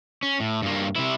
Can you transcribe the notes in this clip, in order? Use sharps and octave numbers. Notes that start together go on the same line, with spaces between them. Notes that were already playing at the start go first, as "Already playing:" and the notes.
C#4
A2
G2 A#3
C3 E4